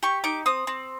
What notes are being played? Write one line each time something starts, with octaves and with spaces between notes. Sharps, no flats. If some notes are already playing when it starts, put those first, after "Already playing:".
G4 C#6
D#4 D6
C4 D#6
C4